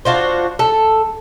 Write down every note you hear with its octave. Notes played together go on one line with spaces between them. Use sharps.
D4 F4 F#4 C5
A4